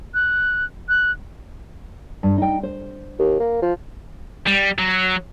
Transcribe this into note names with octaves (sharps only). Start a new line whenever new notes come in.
F#6
F#6
G2
D#4 G5
C5
D#2
A#3
F3
G3
F#3